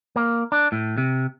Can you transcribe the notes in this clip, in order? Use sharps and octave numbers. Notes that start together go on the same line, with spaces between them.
A#3
D4
A2
C3